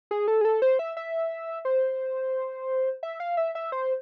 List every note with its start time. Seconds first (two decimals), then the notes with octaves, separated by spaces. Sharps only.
0.11 G#4
0.28 A4
0.41 G#4
0.45 A4
0.62 C5
0.79 E5
0.97 E5
1.65 C5
3.03 E5
3.20 F5
3.37 E5
3.55 E5
3.72 C5